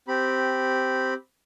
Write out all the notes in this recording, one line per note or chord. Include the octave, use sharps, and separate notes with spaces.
C4 G4 B5